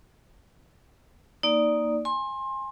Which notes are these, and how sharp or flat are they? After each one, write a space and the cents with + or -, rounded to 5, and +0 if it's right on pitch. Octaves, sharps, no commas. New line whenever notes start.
A#3 +0 D#4 +0 D5 +0
G#5 -5 C6 +25